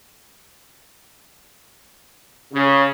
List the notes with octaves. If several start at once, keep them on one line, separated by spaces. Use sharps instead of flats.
C#3